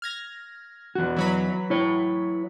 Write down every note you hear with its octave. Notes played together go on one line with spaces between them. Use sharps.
F6 G#6 A#6
E2 F#4
E3 F#3 B5
E4 C#5